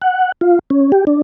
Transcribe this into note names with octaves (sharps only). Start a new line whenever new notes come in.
F#5
F4
C#4
G4
D4